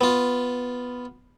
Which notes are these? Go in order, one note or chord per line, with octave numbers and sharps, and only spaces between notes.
B3 F4